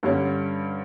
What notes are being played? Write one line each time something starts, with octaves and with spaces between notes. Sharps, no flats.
G2 D3 G3 C#4